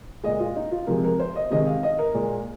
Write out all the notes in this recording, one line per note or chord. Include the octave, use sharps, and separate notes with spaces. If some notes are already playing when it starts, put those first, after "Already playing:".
A#2 G#3 D#5
F4
D#4
F4
C3 F3 G#3 A#4
A#4
C5
D#5
C3 D#3 G#3 D#5
F5
D#5
A#4
A#2 G#3